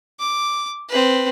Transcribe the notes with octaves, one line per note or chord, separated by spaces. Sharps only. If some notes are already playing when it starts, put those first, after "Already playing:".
D6
C4 B4